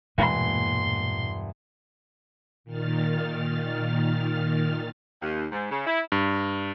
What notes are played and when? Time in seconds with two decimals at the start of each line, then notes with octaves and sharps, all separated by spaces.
0.18 E1 G2 A#2 E3 G#3 A#3 C6
2.64 A#2 D#3 F6 A6
5.21 D#2
5.52 G#2
5.70 C#3
5.87 E4
6.12 G2